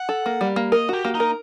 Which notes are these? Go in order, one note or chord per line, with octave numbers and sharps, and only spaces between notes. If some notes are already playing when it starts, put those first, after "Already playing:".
Already playing: F#5
A4
A#3
G3
A#3
A#4 D#5
F#4 G4
A#3
D#4
A#4